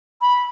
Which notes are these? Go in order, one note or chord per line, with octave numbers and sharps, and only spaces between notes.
B5